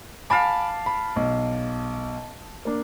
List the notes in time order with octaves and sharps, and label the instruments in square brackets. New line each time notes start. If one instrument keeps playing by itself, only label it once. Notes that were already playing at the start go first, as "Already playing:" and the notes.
[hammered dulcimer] F5 A5 D6 [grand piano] G#5 B5
[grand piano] B5
B1
A#3 D4